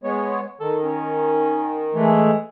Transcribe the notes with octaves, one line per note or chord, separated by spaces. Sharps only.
G#3 B3 C#5
D#3 A4
C#4
E3 G#3 A3